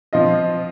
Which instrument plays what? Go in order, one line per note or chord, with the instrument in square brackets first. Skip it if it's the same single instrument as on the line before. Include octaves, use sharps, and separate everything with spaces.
[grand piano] F3 C4 F4 D#5